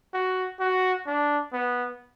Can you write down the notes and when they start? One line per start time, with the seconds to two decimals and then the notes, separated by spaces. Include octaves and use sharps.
0.13 F#4
0.60 F#4
1.07 D4
1.53 B3